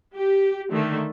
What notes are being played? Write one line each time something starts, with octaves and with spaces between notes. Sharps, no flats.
G4
D3 D#3 A3